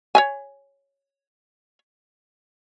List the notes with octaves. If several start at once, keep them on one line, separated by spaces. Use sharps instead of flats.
C#5 E5 G#5